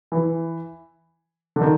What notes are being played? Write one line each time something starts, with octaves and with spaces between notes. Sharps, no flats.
E3
D3
D#3